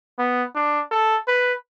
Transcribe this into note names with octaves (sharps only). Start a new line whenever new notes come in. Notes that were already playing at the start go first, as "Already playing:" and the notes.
B3
D4
A4
B4